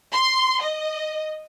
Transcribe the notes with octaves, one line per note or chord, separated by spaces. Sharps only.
C6
D#5